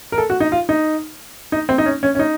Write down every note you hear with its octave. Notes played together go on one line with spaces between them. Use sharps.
A#4
A4
F#4
D#4
F4
D#4
D#4
C4
D#4
C#4
C#4
C#4
D#4